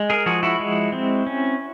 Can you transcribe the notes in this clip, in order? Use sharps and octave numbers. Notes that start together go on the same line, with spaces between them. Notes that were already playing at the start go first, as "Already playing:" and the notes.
Already playing: G#3
G#4 A#4
F3 F#4 G#4
E4 F#4
G#3
C4
C#4